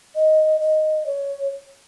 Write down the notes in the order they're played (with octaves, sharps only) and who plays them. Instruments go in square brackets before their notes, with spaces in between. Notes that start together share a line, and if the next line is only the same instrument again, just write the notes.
[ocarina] D#5
D#5
C#5